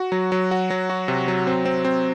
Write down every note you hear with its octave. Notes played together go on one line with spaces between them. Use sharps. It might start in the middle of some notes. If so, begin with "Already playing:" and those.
Already playing: F#4
F#3
F#3
F#4
F#3
F#4
C3
F#3
C4
C4
C4